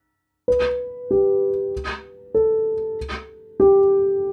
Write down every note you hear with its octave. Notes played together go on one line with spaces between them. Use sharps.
B4
G4
A4
G4